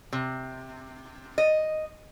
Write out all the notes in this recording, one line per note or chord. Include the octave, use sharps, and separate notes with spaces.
C3
D#5